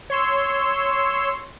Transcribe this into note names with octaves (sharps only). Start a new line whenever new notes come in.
C#5 C6 E6